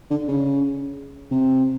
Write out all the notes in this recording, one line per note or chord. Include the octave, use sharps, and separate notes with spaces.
D3
C#3
C3